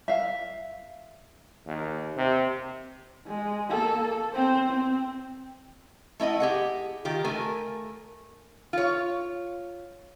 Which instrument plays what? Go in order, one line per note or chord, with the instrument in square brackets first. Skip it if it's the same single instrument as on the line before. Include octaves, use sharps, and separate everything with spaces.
[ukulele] E5 F5
[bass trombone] D#2
C3
[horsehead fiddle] G#3
A#3 A4
A4
C4 C5
C4
[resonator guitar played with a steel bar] A3 E4 D#5 F#5
G4 G#4 F#5
D#3 F4 G4
A3 A#4 G#5
F4 C#5